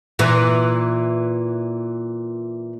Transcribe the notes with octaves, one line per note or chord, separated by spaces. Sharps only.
A#2 E3